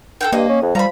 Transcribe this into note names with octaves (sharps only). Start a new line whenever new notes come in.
A4 F#5 G5
G2 A#3 D#5
C#4
F2
F3 G3 A#5 B5